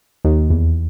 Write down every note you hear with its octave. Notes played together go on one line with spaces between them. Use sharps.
D#2
E2